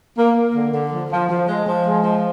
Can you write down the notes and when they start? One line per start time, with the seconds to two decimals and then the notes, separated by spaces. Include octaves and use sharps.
0.18 A#3
0.36 A#3
0.55 D3
0.74 D3
0.92 F3
1.11 F3
1.29 F3
1.48 G#3
1.67 F3
1.86 G#3
2.04 F3